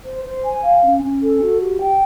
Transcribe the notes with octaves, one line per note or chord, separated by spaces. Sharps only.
C5
C5
G#5
F5
C#4
C#4
A4
F#4
G4
G5